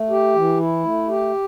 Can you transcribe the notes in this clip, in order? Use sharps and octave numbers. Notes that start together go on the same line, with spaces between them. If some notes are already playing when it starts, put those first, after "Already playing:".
Already playing: A3
G4
E3
E4
A3
G4